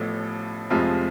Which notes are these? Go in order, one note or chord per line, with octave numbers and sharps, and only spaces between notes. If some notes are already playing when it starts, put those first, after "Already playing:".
Already playing: A1 A2 F3 A3 B3
F1 F2 C3 F3 G#3 F4